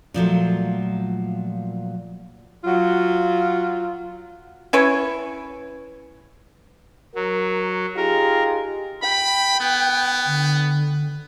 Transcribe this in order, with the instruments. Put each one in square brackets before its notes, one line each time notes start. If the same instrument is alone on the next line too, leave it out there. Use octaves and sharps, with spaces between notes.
[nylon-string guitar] A#2 F3 F#3 A3
[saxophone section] F#3 F4
[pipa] C#4 E4 B4 C#5
[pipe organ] F#3 [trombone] A#4
[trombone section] D#4 F4 G#4 [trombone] G4 [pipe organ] A#4
[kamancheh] G5 [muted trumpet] B5
[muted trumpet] B3
[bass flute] D3